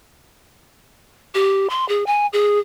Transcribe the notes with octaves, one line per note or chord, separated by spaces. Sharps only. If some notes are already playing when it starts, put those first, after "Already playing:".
G4
C6
G#4
G#5
G#4